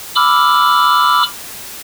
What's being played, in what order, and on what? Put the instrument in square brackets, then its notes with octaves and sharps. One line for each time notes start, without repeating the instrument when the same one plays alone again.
[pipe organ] B5 D6 E6 F6